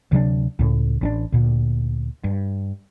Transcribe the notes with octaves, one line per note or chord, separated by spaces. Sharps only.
D2 C3 F#3 D4
C#2 A2
A1 C#4 D4
D2 A#2
G2